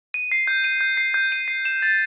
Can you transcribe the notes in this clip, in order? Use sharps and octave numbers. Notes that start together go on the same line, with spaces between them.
D#7
C7
G6
D#7
G6
C7
G6
D#7
C7
E7
A6